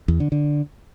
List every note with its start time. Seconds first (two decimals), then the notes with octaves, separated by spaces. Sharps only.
0.08 E2
0.20 D3
0.32 D3